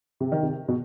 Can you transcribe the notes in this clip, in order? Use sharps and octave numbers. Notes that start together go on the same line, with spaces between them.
C3
D#3
C3
B2